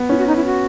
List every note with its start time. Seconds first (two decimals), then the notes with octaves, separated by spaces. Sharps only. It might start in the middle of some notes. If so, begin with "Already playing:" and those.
Already playing: B3
0.09 C#4 E4
0.18 F#4
0.27 D#4
0.36 E4
0.45 F#4